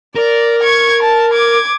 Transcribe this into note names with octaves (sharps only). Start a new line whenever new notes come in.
A#4 D5
C#6 G#6
A5
D6 G#6